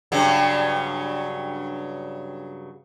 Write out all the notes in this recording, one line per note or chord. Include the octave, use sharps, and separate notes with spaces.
G2 C#3 F#3